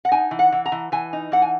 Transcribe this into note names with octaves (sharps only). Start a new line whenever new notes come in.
F#5
D#4 G#5
E3
F#5
E3
A#5
E3
E3 G#5
D#4
E3 F#5
G#5